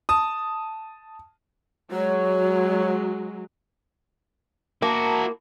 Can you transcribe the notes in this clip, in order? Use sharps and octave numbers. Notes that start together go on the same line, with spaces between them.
A5 D#6
F#3 G#3 C#5
A#3 E4 F#4 A5 A#5